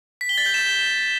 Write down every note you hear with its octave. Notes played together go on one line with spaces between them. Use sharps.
B6
G7
A6
G6
E7